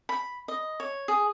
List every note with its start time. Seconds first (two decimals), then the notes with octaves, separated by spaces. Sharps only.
0.09 B5
0.48 D#5
0.80 C#5
1.08 G#4